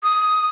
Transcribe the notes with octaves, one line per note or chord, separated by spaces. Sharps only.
D#6